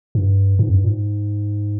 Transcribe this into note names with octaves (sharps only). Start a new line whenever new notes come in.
G2
G#2
F2
G2
A#2
G#2